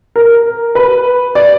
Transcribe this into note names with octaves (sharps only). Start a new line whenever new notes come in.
A#4
B4
D5